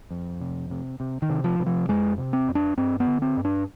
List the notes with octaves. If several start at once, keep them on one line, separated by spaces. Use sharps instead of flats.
F2
C3
C3
C3
D#3
C3
F3
C3
F3
F2 G#3
C3
C4
F2
D4
G2 C4
B3
D3
C4
G2
D4